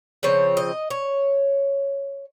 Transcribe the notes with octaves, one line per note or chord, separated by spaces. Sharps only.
C#3 F3 C4 C#5
D#5
C#5